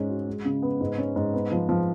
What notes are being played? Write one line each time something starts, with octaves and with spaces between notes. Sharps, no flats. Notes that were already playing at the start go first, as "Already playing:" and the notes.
Already playing: G#2 G#3 C#4
F#4
G#3
C#3
B3
G#2
C#4
G#2
B3
F3
F3